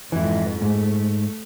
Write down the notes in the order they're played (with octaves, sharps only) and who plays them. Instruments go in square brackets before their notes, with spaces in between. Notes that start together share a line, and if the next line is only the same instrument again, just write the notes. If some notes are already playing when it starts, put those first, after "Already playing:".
[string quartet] F2 G#2 [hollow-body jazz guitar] E3 E4
[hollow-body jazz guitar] G#2 [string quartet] A3